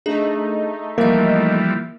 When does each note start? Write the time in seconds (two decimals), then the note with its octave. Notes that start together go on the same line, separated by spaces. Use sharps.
0.06 A3 D4 D#4 G#4
0.98 E3 F3 G3 A#3 A#4 E5